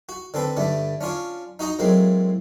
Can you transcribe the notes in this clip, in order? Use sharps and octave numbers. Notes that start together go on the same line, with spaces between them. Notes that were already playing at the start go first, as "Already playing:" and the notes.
F#4
D3 C4 A4 B4
G2 D3 A3
C#4 D4 F4 C#5
D#4 F#4 D#5 A#5
A2 F#3 G#3 A#3 C4